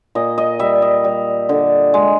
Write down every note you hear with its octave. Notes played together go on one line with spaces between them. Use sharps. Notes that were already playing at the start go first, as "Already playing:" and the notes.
A#2 D#5
D#5
G3 E5
D#5
G3
D3
G#3